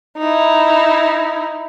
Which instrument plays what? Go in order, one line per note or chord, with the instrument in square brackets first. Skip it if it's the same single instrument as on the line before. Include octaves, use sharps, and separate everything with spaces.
[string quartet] D#4 E4